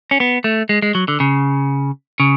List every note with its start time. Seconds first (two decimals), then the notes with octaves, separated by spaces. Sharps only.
0.11 C#4
0.20 B3
0.44 A3
0.69 G#3
0.82 G#3
0.95 F#3
1.08 D3
1.20 C#3
2.20 C#3